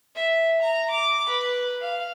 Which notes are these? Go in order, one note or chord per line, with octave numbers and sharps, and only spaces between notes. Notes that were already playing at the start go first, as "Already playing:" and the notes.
E5
A#5
D6
B4
F5